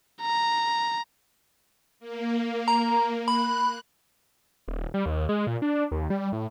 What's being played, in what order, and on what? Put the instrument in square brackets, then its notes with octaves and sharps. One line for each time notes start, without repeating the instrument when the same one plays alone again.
[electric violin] A#5
[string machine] A#3
[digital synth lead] A#5
[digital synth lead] B5 [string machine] F#6
[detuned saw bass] D#1
G3
D#2
G#3
A#2
D4
D#2
G3
A2